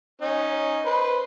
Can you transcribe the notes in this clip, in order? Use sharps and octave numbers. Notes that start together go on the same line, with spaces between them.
C#4 D#4
B4 C5